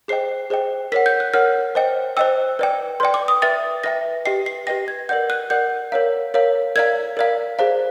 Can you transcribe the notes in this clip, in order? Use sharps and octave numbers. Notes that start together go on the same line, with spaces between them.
G#4 C5 D#5 G5 C7
G#4 C5 D#5 G5
A#4 C#5 F#5 B6
G6
F#6
A#4 C#5 F#5 F6
C5 D#5 G5
C5 D#5 G5 E6
B4 D5 G5
B4 D5 G5 C6
D6
D#6
B4 E5 G5 A6
B4 E5 G5 A#6
G4 B4 D#5 G5 C7
C7
G4 B4 D#5 G5 A#6
G#6
A#4 D5 F#5 G6
F#6
A#4 D5 F#5 G6
A#4 C#5 F5
A#4 C#5 F5
A#4 D5 F5 G#6
A#4 D5 F5
G#4 C5 F5